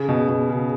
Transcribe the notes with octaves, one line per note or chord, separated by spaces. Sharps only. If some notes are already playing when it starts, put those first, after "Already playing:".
Already playing: C#3
B2
B2
C#3